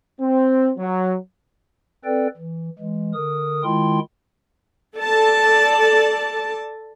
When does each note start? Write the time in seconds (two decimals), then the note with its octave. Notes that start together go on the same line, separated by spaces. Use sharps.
0.21 C4
0.78 F#3
2.05 C4 A4 B4 D5 G5
2.37 E3
2.79 E3 G#3
3.14 D3 A#4 D#6
3.64 D#3 G#3 E4 F4 G5 C6
4.96 A4 D5 A5